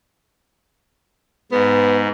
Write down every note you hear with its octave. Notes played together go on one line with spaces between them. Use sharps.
G#2 B3